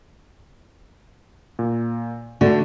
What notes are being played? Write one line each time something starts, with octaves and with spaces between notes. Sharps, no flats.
A#2
D3 A3 F#4